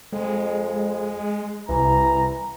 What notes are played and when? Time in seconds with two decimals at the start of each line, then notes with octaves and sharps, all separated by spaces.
0.12 F2 G#3
1.69 C2 E3 A#5